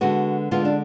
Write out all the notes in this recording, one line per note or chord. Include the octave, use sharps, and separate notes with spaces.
D3 G#3 B3 F#4
D3 G#3 B3 F4
D4